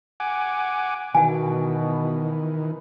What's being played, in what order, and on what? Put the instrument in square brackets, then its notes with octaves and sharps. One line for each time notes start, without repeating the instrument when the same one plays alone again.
[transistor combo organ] F#5 G#5 D6
[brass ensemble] B2 [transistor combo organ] D#3 E3 [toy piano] F#5 G#5